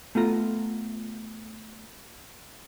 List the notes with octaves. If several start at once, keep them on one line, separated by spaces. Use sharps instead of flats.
A3 B3 F4 A#5